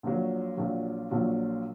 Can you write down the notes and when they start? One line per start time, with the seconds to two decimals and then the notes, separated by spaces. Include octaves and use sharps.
0.03 A#1 A#2 F#3
0.57 A#1 A#2 F#3
1.11 A#1 A#2 F#3